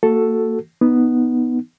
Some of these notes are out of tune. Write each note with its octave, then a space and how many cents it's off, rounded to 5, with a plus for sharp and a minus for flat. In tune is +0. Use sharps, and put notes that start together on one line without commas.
A#3 -35 F#4 +0 A4 +0
B3 +0 D#4 +0